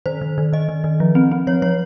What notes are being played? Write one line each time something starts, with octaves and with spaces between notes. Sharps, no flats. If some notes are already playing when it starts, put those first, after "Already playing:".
D#3 C5
D#3
D#3
D#3 D#5
D#3
D#3
F3
C4
C4
F3 C#5
F3 C#5